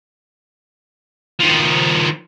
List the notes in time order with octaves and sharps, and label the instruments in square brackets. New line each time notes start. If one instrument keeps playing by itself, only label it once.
[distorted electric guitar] D#3 F3